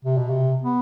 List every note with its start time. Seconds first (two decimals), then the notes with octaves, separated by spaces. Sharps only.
0.05 C3
0.17 B2
0.30 C3
0.62 B3